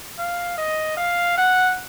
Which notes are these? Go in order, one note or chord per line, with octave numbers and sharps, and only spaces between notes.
F5
D#5
F5
F#5